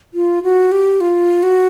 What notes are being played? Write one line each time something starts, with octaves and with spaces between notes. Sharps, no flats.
F4
F#4
G4
F4
F#4